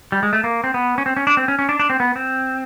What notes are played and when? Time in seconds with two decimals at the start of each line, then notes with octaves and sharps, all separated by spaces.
0.12 G3
0.23 G#3
0.33 A3
0.44 A#3
0.64 C4
0.74 B3
0.98 C#4
1.06 C4
1.17 C#4
1.27 D4
1.37 C4
1.48 C#4
1.59 C#4
1.69 D4
1.80 D4
1.90 C4
2.00 B3
2.16 C4